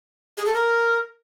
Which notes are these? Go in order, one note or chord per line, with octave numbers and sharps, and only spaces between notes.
G#4
A4
A#4